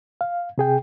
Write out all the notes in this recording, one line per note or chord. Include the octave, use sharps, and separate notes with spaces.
F5
C3 G#4 G5